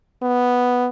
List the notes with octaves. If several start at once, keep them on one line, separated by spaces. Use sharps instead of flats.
B3